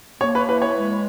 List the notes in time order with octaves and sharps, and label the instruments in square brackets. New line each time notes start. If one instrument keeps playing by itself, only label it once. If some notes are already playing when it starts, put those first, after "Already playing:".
[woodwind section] A#3 [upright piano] C#5
[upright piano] B4
[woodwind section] E3 [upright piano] B4
[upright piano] C#5
[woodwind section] G#3